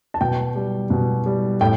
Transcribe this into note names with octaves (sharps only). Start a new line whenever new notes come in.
A5
B2 G5
G3
B2
G3
A2 G5